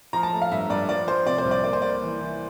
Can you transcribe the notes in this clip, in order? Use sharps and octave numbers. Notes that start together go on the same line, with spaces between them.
F3 A#5
A5
A3
F5
G2 E5
G2 D5
F3 D5
F3 C5
C3 D5
C5
C2
D5
A#3 D5
C5
A#3 D5
E3
E3